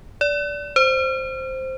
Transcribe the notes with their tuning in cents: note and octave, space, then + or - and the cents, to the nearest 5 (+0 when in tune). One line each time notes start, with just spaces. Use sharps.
D5 -20
C5 +0